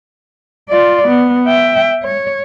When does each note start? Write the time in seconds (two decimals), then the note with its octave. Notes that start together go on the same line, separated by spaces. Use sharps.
0.69 F4 D5
1.08 B3
1.47 E5 G5
2.03 C#5